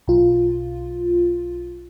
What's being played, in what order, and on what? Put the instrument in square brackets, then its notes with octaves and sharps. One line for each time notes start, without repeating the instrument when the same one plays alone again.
[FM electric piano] B1 F4